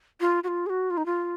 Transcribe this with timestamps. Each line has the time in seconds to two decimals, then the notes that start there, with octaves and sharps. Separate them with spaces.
0.20 F4
0.44 F#4
0.48 F4
0.66 G#4
0.70 F#4
0.90 F4
0.97 D#4
1.06 F4